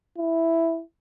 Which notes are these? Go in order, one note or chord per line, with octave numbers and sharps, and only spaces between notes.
E4